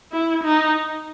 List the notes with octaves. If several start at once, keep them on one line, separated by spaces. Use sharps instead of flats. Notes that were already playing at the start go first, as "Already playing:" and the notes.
E4
D#4